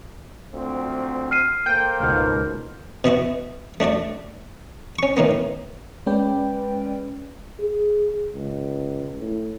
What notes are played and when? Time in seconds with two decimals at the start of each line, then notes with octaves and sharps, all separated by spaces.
0.51 D2 F3 C4
1.31 F6 C7 D#7
1.66 A#3 A4 C5 G5 G6
2.00 C#2 G#2 B2 F6 G6
3.04 B2 B3 E4 F#4
3.80 A3 D4 F#4 D5
4.99 C#4 C#6
5.17 A2 D#3 A#3 B3
6.06 G#3 C#4 B4 D5 G5
7.60 G#4
8.33 C#2
9.20 A2